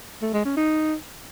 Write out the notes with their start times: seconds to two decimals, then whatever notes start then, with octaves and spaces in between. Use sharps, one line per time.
0.22 A3
0.33 G#3
0.45 C#4
0.56 D#4